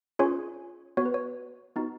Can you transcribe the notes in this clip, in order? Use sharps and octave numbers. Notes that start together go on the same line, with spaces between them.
C#4 F4 G#4 C#5
B3 F#4 C#5
B4
C#5
B3 D#4 F#4